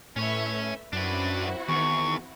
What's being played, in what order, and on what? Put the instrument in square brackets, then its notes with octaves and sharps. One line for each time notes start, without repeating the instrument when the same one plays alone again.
[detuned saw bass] A2 [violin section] A3 B4 E5 [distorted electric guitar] C#4 C#5
[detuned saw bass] F#2 [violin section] C4 E4 F#4 [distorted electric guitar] D4 B4
[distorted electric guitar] E2 [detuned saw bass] D#3 [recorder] C#6